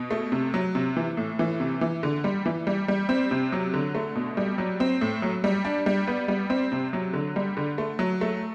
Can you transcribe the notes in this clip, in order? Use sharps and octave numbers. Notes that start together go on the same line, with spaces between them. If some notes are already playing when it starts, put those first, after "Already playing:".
Already playing: B2
A3
C3
F#3
C3
E3
A2
E3
C3
E3
D3
G3
E3
G3
G3
C4
C3
F#3
D3
A3
B2
G3
F#3
C4
A2
F#3
G3
D4
G3
B3
G3
C4
C3
F#3
D3
G3
D3
A3
F#3
A3